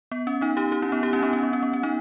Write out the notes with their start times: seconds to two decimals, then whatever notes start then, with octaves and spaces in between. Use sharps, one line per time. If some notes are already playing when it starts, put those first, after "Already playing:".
0.12 B3
0.27 C#4
0.41 B3 D#4
0.57 D#4 G4
0.72 D#4 G4
0.82 C#4 E4
0.92 B3 D#4
1.03 D#4 G4
1.13 C#4 E4
1.22 B3 D#4
1.33 C#4
1.43 B3
1.53 C#4
1.63 B3
1.73 C#4
1.83 B3 D#4